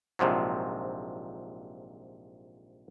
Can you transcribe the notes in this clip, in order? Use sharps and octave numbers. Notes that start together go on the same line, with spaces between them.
A#1 G#2 C3 F3 F#3